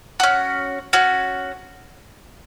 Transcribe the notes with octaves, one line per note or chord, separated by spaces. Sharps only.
C#4 F#4
C#4 F#4